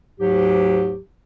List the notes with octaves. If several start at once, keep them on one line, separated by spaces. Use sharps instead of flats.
D2 G#2 F#3 G4